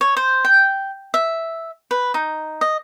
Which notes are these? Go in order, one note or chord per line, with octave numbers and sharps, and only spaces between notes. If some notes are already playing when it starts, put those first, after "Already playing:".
C#5
C5
G5
E5
B4
D#4
D#5